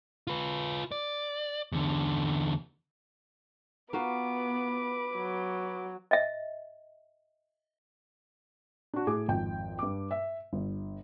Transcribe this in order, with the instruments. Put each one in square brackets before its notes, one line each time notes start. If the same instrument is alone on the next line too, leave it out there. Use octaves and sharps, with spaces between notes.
[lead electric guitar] F4 B4
D5
E2 D3
[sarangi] B3 [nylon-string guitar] F4 F#4 A#4 [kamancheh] B4 D6
[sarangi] F#3
[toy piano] D#5 E5
[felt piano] D4 F#4
A2 G#4 D6
G#1 F2 G5
G2 D6
E5
G1